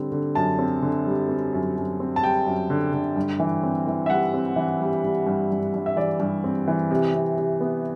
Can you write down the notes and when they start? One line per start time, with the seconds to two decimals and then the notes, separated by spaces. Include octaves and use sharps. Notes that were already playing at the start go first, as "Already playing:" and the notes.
Already playing: D3 G3 C4
0.12 D3
0.35 F#2 A5
0.59 C4
0.82 D3
1.07 G3
1.29 C4
1.53 F#2
1.76 F#2
2.00 C4
2.16 A5
2.22 G3 G5
2.46 F#2
2.70 D3
2.93 D3
3.16 G2
3.40 E3
3.63 C4
3.87 E3
4.06 E5
4.10 G3 F#5
4.34 C4
4.56 E3
4.81 G3
5.04 G3
5.26 G2
5.51 G2
5.74 G2
5.86 E5
5.96 E3 D5
6.20 G2
6.44 C4
6.68 E3
6.91 C3
7.14 C3
7.38 C3
7.61 B3